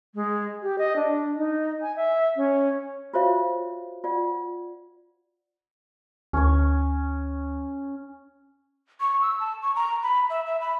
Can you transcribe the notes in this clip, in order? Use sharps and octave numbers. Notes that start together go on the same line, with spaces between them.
G#3
G4
D#5
D4
D#4
G#5
E5
C#4
F4 F#4 C5 C#5 E5 F5
F4 D5 F#5
D2 C#4 C#5
C#6
E6
A5
C#6
A#5
B5
E5
E5
B5